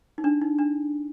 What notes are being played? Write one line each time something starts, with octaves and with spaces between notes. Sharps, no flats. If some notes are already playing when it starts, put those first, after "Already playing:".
D#4
D4
D#4
D4